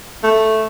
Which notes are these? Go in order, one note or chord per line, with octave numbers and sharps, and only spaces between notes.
A3